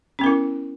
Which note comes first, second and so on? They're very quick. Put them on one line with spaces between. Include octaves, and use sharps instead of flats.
C#4 B3 A#4 E4